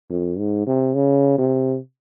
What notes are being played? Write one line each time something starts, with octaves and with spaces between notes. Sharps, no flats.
F2
G#2
C3
C#3
C3